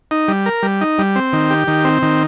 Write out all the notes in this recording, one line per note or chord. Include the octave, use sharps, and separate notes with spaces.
D#4
G3
A#4
G3
D#4
G3
C4
D#3
G4
D#3
C4
D#3